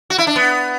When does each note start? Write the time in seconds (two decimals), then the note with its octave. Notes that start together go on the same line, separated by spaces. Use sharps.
0.10 F#4
0.18 E4
0.27 D4
0.36 B3